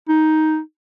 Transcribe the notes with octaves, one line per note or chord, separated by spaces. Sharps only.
D#4